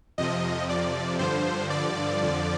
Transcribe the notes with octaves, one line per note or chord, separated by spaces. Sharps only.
F2 C3 F3 D#5
D5
G2 D3 F3 C5
D5
F2 D3 F3